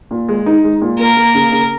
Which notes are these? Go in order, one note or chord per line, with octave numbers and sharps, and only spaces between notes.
A#2
G#3
D#4
G#3
A#2
A#3 A#4
A#3
C#3
C#3